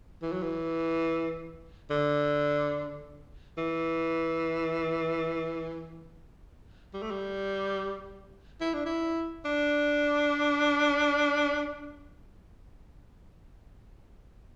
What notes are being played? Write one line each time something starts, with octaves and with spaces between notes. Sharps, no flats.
E3
F#3
E3
D3
E3
G3
A3
G3
E4
D4
E4
D4